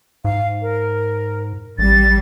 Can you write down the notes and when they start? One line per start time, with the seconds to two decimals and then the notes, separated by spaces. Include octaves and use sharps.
0.25 G#2 F5
0.62 A#4
1.79 A1 G3 A6